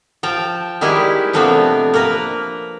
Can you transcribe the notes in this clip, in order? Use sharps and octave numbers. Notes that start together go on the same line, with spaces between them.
F3 G5 A5
D#3 G3 G#3 E4 G4
C3 F3 A3 B3 C4 D4
A#3 A#4 B4